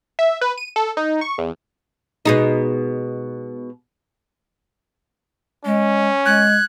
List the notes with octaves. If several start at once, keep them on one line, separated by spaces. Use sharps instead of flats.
E5
B4
D#7
A4
D#4
C#6
E2
B2 G#3 D#4
G#3 C#4
G#3 F#6 G#6